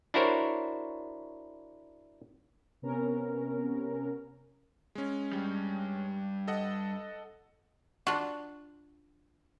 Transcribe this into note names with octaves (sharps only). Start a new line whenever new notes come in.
D4 E4 F#4 A#4 C5 C#5
C3 B3 C#4 A#4
G#3 C#4
G2 G3
A4 D#5 F#5
D4 F4 F#4